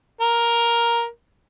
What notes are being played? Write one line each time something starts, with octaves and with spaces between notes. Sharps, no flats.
A#4